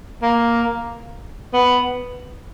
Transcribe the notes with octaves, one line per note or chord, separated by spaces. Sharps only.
A#3
B3